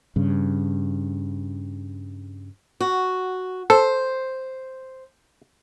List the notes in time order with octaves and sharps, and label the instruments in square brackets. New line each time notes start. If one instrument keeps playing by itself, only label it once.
[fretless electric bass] G2 C#3
[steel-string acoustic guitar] F#4
[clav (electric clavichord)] A4 [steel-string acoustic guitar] C5